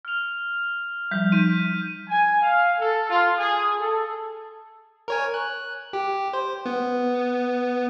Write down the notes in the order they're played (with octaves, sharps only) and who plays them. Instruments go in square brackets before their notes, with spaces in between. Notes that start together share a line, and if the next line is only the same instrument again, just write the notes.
[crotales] F6 F7
[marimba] F3 G3 [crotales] G6 B6
[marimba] D#4 [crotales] G6 B6 D#7
[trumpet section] G#5
F5
A4
F4
G#4
A4
[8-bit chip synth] A#4 C#5 G#5
F#6
G4
C5
B3